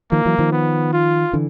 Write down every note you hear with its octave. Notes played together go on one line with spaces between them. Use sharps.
D#3 F3 A#3
E3 F#3
D#3 F3
B3
F4
D3 E3